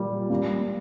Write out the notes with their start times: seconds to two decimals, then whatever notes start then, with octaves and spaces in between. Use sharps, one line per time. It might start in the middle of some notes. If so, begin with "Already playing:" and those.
Already playing: A#2 G3 A#3
0.30 G3 A#3